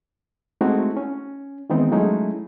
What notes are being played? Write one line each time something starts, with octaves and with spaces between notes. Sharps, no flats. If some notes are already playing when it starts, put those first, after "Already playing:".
G#3 A3 C4 D#4 E4 F#4
C#4
D#3 E3 G#3 B3 C4 D#4
F#3 G#3 A3 C#4 D#4 E4